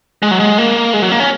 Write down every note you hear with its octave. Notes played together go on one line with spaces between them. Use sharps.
G#3
F#3
G#3
A#3
G#3
F#3
A#3
C#4